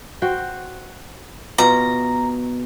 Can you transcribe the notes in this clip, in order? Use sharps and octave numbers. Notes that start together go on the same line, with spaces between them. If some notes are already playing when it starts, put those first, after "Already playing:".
F#4 C5 G5
B2 F4 A#5